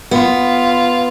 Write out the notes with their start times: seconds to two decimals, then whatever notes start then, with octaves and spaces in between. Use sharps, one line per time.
0.11 B3 F4